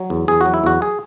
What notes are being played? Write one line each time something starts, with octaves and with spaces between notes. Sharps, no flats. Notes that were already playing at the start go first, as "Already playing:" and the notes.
Already playing: F#3
E2
E2 G#4
F#3 F#4
E4
E2 F#4
G#4